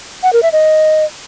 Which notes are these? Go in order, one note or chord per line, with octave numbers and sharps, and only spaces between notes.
F#5
A#4
E5
D#5